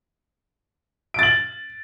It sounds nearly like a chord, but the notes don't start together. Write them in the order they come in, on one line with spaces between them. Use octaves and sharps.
D7 A6 F#7